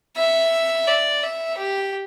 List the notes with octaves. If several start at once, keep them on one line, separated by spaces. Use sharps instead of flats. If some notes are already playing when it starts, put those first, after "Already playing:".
E5
D5
E5
G4